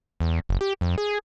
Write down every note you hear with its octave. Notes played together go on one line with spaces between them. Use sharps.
E2
F#1
G4
F2
G#4